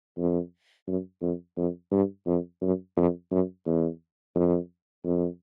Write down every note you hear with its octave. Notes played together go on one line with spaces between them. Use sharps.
F2
F#2
F2
F2
G2
F2
F#2
F2
F#2
E2
F2
F2